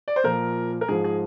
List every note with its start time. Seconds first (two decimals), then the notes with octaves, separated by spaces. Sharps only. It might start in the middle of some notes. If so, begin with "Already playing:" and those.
0.08 D5
0.16 C5
0.24 A#2 F3 A#4
0.81 A#4
0.88 G#2 F3 G#4
1.04 G#4